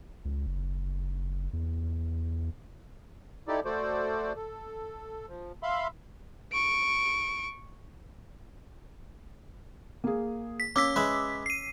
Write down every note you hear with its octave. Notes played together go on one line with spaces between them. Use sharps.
C#2
F#1
E2
D#4 E4 G4 A4 D5
A3 F#4 A4 C5 D5
A4
F3
E5 F5 B5 C6
C#6 D7
A#3 G#4
B6
A#3 C#4 D6 E6 B6
G#3 B4 E5
C7 D#7